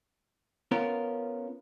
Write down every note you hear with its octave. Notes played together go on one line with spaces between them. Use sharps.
B3 C#4 F4 A#4